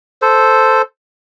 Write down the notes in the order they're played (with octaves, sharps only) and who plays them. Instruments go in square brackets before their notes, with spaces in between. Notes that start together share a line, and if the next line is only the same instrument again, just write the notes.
[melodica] A4 C5